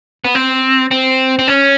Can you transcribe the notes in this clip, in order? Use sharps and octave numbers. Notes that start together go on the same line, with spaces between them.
B3
C4
C4
C4
C#4